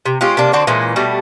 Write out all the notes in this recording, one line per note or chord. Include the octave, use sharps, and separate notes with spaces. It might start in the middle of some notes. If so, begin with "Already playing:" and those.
C3
G#3 C#4 F4 G4
C3 A#3 D4
D3 C4 F#4 D5
A#2 E3 G#3 C#4
B2 G3 A3